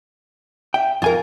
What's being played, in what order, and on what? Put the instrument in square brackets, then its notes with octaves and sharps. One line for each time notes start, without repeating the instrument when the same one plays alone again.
[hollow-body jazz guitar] E5 G5
[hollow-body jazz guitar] F2 G#5 [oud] F4 A#4